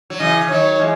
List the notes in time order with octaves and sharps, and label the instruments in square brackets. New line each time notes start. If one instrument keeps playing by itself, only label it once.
[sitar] F#3
[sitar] C#3 E3 [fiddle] D#5
[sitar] E3
[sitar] D#3 F#3 [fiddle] C#5
[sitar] E3 G#3